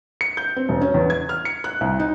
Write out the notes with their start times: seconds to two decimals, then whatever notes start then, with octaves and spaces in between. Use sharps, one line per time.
0.21 C#7
0.37 G6
0.56 C4
0.69 E1
0.81 C#4
0.94 E2
1.10 G#6
1.29 F6
1.45 C#7
1.64 F#6
1.81 C2
2.00 D#4